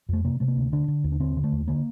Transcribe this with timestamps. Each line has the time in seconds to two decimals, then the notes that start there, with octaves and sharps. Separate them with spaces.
0.09 F2 A3
0.24 C3 A#3
0.40 C3 A3
0.48 A#3
0.57 D2
0.72 D3 D4
0.88 D3
1.04 D#2
1.12 D4
1.20 D3 C4
1.37 D3
1.44 A3
1.52 D#2
1.68 D3 A#3